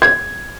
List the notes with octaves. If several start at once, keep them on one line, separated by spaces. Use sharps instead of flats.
G#6